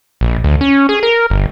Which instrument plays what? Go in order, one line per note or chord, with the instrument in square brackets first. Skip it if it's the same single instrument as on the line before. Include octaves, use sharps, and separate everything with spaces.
[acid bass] A#1
D2
C#4
G#4
A#4
G1